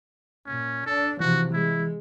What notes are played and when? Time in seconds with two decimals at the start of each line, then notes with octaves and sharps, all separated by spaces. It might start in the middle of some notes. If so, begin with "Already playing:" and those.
0.47 A#2 C#4
0.86 D4 A4
1.20 C3 E3 F3 F#4
1.54 G#3 E4